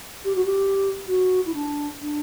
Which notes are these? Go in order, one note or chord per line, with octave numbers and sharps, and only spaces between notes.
G4
F#4
G4
F#4
E4
D4
D4